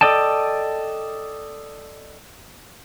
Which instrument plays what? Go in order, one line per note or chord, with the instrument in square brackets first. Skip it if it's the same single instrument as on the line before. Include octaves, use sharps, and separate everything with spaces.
[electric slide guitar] A4 B4 D5 D#5 G5 A5